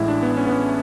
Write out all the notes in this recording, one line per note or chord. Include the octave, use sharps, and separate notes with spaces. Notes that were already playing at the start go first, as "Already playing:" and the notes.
Already playing: A1 A2 G#3 E4
D4
B3
C#4
B3
C#4